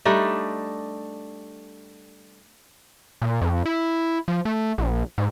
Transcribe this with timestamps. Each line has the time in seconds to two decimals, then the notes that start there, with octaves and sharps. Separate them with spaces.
0.05 G3 A3 D4 D#4
3.22 A#2
3.41 F2
3.66 E4
4.28 F3
4.45 A3
4.78 A#1
5.18 G#2